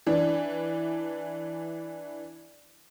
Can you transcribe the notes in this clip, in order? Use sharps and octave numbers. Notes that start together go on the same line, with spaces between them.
E3 D4